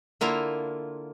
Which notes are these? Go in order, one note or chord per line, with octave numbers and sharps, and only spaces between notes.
D3 A#3 E4 F4